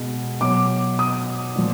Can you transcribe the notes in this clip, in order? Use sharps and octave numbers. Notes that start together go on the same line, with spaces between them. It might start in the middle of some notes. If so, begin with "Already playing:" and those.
Already playing: B2 G#3
B2 F#3 D6
D#6
A#2 F3